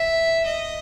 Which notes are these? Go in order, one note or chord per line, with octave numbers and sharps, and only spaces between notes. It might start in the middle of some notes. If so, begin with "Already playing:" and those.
Already playing: E5
D#5